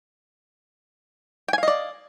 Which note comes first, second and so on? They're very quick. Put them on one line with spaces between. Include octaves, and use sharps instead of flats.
G5 G#5 F5 D#5 D5